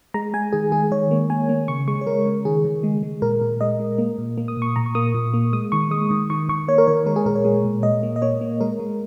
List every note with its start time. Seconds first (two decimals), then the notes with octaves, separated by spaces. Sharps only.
0.14 G#3 A#5
0.34 G#3 G#5
0.53 D#3 G#4
0.72 G#3 G#4
0.91 D#3 C#5
1.11 A#3
1.30 A#3 G#5
1.49 A#3
1.68 C#3 C#6
1.88 G#3 C#6
2.01 C#5
2.07 G#3 A#4
2.26 C#3
2.45 D#3 G#4
2.65 D#3
2.83 G#3
3.03 G#3
3.22 A#2 A#4
3.42 A#2
3.61 G#3 D#5
3.80 G#3
3.98 A#3
4.18 A#2
4.38 A#3
4.48 D#6
4.57 A#2
4.62 C#6
4.76 A#2 A#5
4.86 C#6
4.95 A#3 D#6
5.15 A#2
5.34 A#3
5.53 G#3 D#6
5.72 D#3 C#6
5.91 G#3 D#6
6.11 D#3
6.30 D#3 C#6
6.49 D#3 C#6
6.68 A#3 C#5
6.78 A#4
6.87 D#3 C#5
7.06 G#3 A#4
7.16 G#4
7.26 A#2 A#4
7.35 C#5
7.45 G#3
7.65 A#2
7.83 A#2 D#5
8.03 A#3
8.16 D#5
8.22 A#3 C#5
8.41 A#3
8.61 G#3 A#4
8.80 G#3